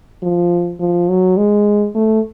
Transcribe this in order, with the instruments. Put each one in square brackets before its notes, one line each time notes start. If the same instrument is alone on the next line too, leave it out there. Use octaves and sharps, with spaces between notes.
[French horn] F3
F3
F#3
G#3
A3